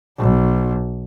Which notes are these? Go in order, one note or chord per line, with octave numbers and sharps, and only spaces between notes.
B1